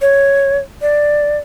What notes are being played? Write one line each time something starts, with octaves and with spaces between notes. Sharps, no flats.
C#5
D5